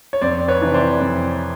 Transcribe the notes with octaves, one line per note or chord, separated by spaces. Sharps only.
C#5
F2 C5 D5
B4 C#5
C3 E3
C5 D5
F2